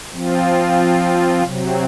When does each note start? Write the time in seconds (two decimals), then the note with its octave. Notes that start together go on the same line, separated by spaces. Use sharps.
0.12 F3 C4 F4
1.43 C3 F#3 C4